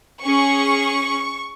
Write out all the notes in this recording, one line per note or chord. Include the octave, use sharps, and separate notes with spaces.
C#4 G#4 C#6